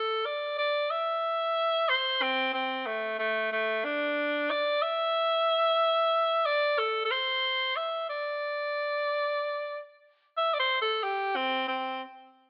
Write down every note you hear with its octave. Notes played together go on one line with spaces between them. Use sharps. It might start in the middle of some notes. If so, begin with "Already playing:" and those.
Already playing: A4
D5
D5
E5
C5
C4
C4
A3
A3
A3
D4
D5
E5
D5
A4
A4
C5
E5
D5
E5
D5
C5
A4
G4
C4
C4